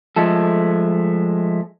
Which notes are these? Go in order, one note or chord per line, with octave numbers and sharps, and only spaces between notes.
F3 G#3 A3 A4